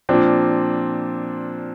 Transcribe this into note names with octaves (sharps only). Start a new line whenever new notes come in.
A#2 F3 C4 D4